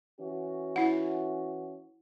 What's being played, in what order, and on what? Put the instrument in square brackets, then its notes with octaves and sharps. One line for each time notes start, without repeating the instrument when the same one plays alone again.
[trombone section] E3 C#4 F#4
[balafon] E4 F#5